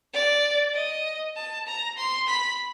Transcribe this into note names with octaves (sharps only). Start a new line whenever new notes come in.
D5
D#5
A5
A#5
C6
B5